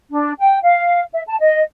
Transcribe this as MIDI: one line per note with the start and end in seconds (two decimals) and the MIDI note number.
0.10 0.32 62
0.39 0.58 79
0.63 1.03 77
1.13 1.22 76
1.27 1.36 81
1.40 1.61 75